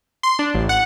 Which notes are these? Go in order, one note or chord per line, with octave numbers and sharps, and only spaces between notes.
C6
D4
A1
F#5